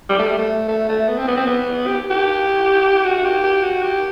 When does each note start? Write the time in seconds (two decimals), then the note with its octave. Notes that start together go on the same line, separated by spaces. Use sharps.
0.09 G3
0.19 A3
0.27 G3
0.38 A3
0.68 A3
0.89 A3
1.08 B3
1.18 C4
1.27 B3
1.36 C4
1.47 B3
1.87 G4
2.10 G4
3.05 F#4
3.24 G4
3.44 G4
3.63 F#4
3.82 G4